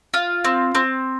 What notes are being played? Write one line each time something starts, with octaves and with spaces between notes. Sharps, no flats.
F4
C4
C4